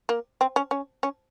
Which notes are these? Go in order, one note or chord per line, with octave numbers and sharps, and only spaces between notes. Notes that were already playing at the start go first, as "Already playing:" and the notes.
A#3
C4
C#4
C#4
C#4